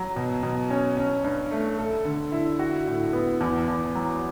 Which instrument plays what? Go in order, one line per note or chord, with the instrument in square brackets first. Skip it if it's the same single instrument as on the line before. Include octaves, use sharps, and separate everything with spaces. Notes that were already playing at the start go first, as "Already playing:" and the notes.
Already playing: [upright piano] F#3
B2
B2
C#4
C#4
G2
A3
A4
D3
E4
F#4
A2
B3
E2
E2
F#3